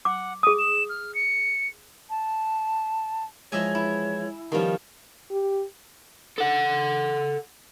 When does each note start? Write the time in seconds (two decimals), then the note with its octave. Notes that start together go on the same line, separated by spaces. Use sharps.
0.05 F#5 D6
0.43 G#4 D#6 D#7
0.58 E7
0.89 F6
1.15 C#7
2.10 A5
3.52 E3 F3 G#3 C#5 D#5 E5 G#5
3.75 E4
4.52 B2 D#3 F3 G3 C#4
5.31 G4
6.38 A4 F#5